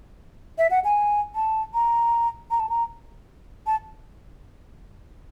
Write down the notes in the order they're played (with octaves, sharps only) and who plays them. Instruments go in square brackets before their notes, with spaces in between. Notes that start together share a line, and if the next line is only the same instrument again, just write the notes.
[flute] E5
F#5
G#5
A5
A#5
A#5
A5
A#5
A5